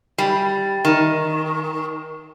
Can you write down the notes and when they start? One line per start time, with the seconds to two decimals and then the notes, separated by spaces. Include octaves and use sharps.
0.18 G3
0.85 D#3